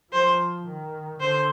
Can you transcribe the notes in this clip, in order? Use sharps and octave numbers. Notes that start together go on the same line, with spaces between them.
F3 C5
D#3
D3 C5